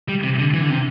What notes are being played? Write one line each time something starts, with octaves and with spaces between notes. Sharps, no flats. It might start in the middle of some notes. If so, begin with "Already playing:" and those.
G3
C3
D3
E3
D3
C3